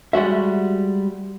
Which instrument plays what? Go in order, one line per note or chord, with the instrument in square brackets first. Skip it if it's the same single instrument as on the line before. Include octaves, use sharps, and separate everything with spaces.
[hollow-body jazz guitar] G3 G#3 F#4 E5